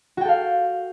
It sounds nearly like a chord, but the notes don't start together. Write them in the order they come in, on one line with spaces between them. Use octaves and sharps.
F#4 G5 A4 F5